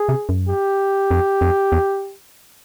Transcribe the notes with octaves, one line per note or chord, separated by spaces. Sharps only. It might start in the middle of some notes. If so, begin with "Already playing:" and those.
Already playing: G#4
C3
F#2
G4
F2
F2
E2